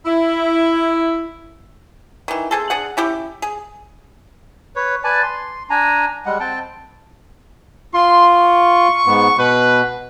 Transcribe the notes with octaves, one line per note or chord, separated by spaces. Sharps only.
E4
D#3 E3
C4 G#4 A4
D4 G#4 F#5
C#4 E4 G4
G#4
B4 C#5
B4 D5 G#5 A5
C6
D4 G#5 A#5
G3 G#3 F#5
C4 G5 A5
F4 C6
C#6
G#2 B3
B2 B4